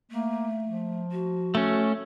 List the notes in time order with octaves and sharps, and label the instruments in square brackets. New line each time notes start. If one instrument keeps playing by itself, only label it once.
[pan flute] A3 [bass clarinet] A#3
[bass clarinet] F3
[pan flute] F#4
[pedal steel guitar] A3 C#4